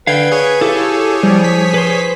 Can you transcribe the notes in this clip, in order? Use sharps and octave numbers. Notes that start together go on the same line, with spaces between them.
D3 B4 F5 G5 G#6
G#4 C#5
E4 G4 A4 F5
F3 G3
B6
B4 C5